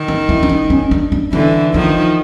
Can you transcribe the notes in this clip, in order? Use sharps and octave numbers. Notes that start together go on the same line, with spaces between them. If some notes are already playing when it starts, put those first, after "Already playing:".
Already playing: D#3
D#4
E4
D4
D#4
C#4
D4
D4
D3 E3 E4
D#3 F3 D#4